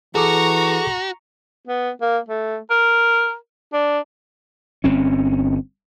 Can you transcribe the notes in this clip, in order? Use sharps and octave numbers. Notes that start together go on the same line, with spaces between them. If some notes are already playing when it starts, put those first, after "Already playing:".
E3 F#4 G#4 A4 A#5 C#6 D6
B3
A#3
A3
A#4
D4
G1 C4 C#4